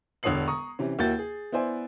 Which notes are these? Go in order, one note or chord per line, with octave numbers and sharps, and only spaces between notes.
E1 D3 C#5 D#6 C7 F#7
A#5 C#6 D#6
C3 E3 C#4
D#2 A#3 E4 F#4 G6 A6
G#4
B3 E4 C5 D5 G#5